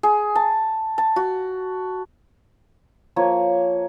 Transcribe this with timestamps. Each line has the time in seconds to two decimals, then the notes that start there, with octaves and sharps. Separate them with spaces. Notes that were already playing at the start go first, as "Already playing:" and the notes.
0.03 G#4
0.35 A5
0.98 A5
1.16 F#4
3.16 F3 A#3 C#5